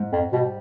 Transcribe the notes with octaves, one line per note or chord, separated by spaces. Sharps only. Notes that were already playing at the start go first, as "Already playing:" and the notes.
Already playing: G#2
F2
B2 G3